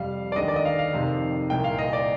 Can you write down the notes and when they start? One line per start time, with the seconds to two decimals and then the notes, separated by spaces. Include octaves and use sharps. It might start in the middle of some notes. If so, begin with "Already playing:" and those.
Already playing: F2 C3 G3 F5
0.32 D5
0.36 D#2 D3 G#3 D#5
0.48 D5
0.56 D#5
0.65 F5
0.79 F5
0.93 F2 C3 D#3
1.50 C2 A#2 G#3 G5
1.64 F5
1.78 D#5
1.93 D5